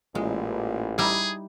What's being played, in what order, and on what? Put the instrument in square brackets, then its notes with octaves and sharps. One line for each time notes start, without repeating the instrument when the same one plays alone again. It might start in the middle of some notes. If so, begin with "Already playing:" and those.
[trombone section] A1 [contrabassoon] A#2 [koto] G#3
[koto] G3 D#4 E4 [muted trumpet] G#4